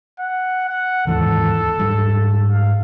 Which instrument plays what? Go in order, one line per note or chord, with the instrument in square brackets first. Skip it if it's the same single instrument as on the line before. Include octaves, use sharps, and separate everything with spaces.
[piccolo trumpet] F#5
F#5
[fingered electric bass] D#2 G#2 E3 [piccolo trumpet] A4
[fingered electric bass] G#2 G3
[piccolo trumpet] F5